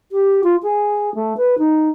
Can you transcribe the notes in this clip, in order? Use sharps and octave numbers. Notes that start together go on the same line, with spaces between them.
G4
F4
G#4
A3
B4
D#4